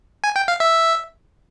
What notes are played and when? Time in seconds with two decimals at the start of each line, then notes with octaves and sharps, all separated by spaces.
0.24 G#5
0.36 G5
0.48 F5
0.60 E5